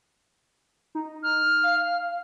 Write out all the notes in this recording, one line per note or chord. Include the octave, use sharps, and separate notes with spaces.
D#4
F6
F5